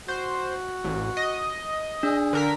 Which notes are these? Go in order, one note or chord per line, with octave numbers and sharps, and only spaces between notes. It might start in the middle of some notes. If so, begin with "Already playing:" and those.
F#4 C5
A1
D#5
D4 G#4
D3 A#4 B6